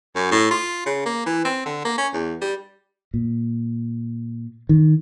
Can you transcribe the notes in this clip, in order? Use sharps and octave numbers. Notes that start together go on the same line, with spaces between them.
F#2
A2
F4
C#3
A#3
E3
C4
D3
A#3
C#4
E2
G3
A#2
D#3